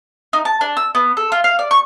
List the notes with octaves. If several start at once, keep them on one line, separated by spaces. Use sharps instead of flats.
D#4
A5
D4
E6
B3
A4
F4
F5
D5
C#6